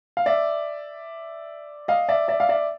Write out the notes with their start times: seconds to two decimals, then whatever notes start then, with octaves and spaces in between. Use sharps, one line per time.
0.17 F5
0.26 D5 E5
1.88 D#5 F5
2.09 D5 E5
2.28 D5 E5
2.40 F5
2.49 D5 E5